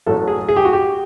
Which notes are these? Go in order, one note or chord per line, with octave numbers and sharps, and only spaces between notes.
A1 A2 F#3 A3 A4
G#4
G#4
G4
F#4
G4